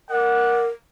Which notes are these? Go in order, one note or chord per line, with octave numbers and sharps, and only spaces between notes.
A#4 D5 F#5